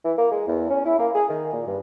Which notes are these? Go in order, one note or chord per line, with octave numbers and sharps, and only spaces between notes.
E3
A#3
G#3
E2
C#4
E4
A#3
G#4
D#3
A#2
G2